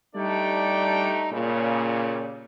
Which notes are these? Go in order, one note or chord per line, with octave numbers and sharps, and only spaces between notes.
G3 A3 D4 D#4 D5 G5
A#2 C#3 G3